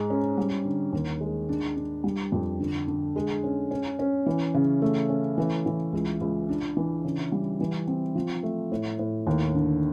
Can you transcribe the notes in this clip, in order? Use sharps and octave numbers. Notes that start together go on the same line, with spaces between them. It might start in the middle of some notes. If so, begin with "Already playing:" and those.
Already playing: G#2 G#3
C#4
G3
D3
D#2
G#3
D4
D4
G3
F2
D3
D3
G#3
C#4
C#4
C#4
E3
C#3
A3
C#4
E3
E3
C#2
C#2
D4
E3
C#3
G3
E3
C4
F3
A3
A2
A2
D#2
D3